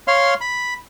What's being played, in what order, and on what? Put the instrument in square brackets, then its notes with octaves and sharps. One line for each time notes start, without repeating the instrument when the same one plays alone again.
[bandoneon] C#5 F5 C6 F6
B5